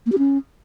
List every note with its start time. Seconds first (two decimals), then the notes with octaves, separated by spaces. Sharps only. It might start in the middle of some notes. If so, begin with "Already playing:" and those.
0.06 A#3
0.12 G4
0.18 C#4